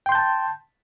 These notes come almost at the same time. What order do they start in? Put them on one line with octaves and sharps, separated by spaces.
G5 C6 G6 A5